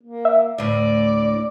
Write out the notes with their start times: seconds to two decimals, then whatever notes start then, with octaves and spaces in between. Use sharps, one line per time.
0.03 A#3
0.25 E5
0.58 D2 A2 D5